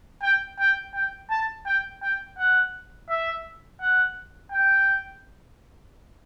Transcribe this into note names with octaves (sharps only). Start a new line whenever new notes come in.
G5
G5
G5
A5
G5
G5
F#5
E5
F#5
G5